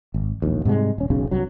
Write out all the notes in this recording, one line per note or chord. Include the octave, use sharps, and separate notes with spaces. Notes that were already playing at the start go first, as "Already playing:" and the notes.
G#1
E1 A#1 D#2
G#2 C3 G3 G#3
D#1 C#4
E1 B1 C#3 C#4
C2 G2 F#3